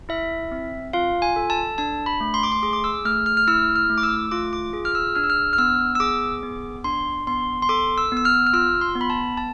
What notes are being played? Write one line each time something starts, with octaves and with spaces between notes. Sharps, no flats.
E4 E5
C4
F4 F5
G#5
A4
A5
D4 A5
B5
A3
C6
D6
C6
G#4 D6
D6
E6
A3 F6
F6
F6
E4 E6
F6
A3
D6
E6
F4 D6
D6
G#4
F6
E6
D4 F6
E6
F6
F6
B3 E6
E6
G#4 D6
B3
D4 C6
B3 C6
C6
A4 D6
E6
B3
E6
F6
F6
F4 E6
C6
B3
B5
A5
A5